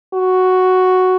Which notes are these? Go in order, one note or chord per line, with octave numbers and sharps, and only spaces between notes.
F#4